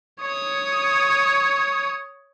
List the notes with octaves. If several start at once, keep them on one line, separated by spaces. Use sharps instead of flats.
C#5 D#6